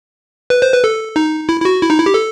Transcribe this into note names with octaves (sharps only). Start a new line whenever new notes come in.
B4
C5
B4
A4
D#4
E4
E4
F#4
E4
D#4
E4
G4
A4